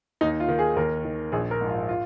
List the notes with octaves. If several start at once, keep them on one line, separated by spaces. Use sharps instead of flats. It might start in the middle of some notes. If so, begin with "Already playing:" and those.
D#2 D#4
F4
D#3
G#4
D#2 A#4
D#3
A#1 G#4
A#4
G#2 F3
F4
F4